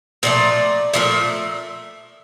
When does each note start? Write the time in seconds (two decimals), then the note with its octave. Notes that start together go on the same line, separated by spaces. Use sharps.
0.23 A#2 F3 A3 D5
0.93 A#2 F3 A3 E5